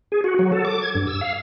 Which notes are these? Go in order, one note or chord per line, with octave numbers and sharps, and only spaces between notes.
G#4
F#4
F#3
A4
D6
G#6
G2
E6
F5